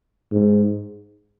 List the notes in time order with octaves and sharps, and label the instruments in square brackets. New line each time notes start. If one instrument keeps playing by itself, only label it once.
[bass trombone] G#2